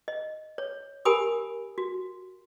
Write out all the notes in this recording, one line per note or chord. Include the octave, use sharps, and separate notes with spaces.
D#5
C#5
G4 A#4 G#5 B5 D#6
F#4